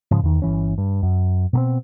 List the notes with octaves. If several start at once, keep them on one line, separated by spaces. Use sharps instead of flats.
G#2 C#3 F3 G#3
E2 D#3
G1 E3 C#4
G2
F#2
B2 A#3 C4